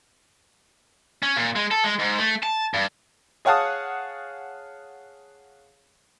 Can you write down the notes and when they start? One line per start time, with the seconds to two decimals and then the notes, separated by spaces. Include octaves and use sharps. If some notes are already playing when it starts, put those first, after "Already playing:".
1.23 C#4
1.36 A#2
1.56 G#3
1.71 A4
1.84 G#3
1.99 G#2
2.18 A3
2.43 A5
2.74 G2
3.45 G#4 C#5 F5 F#5 A5 D#6